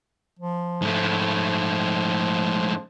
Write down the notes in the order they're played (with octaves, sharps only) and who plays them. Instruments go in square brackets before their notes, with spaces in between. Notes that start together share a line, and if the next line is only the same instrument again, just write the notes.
[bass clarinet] F3
[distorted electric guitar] G#2 A3